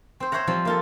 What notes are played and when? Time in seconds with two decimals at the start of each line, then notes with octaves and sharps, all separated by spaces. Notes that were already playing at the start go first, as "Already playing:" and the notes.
0.20 C4 C5
0.32 C5 C#5 E5 F#5 A#5
0.47 F3 G3 C4
0.65 A#3 F4 A4